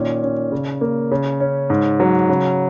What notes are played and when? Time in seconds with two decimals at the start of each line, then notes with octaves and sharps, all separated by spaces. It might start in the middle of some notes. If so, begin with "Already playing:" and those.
Already playing: A#2 D#3 C#4
0.23 C#4
0.52 C#3
0.81 A#3
1.11 C#3
1.40 C#4
1.70 G#2
2.00 F#3
2.29 C#3